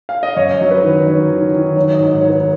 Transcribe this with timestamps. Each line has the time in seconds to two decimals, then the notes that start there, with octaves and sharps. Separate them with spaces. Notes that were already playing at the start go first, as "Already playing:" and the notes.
0.09 F5
0.23 D#5
0.36 F#2 C#5
0.61 F#3
0.71 B4
0.84 D#3
1.07 F#3
1.30 D#3
1.53 D#3
1.76 F#3 C#5
1.93 D#5
1.99 G#2
2.21 D#3 C#5
2.29 B4
2.40 B4